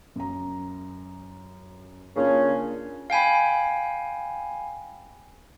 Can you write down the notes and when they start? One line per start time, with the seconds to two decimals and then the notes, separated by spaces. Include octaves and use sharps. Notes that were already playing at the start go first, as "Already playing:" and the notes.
0.16 F#2 A#5
2.16 C#3 A#3 C#4 D4 F4
3.10 F5 G5 G#5 B5